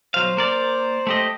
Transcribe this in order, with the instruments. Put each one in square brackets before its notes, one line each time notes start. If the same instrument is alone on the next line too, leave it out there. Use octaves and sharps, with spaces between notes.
[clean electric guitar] B1 F#3 F5 [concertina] C5
[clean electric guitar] A#3 A#4 D5
A3 G4 D#5